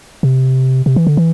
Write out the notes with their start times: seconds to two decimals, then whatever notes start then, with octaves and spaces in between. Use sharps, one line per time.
0.23 C3
0.86 C3
0.96 E3
1.07 D3
1.17 E3